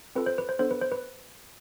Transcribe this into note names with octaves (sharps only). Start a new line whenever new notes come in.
C4 F4 A4 B4
C5
B4
C5
B3 D4 A4 C5
B4
C5
B4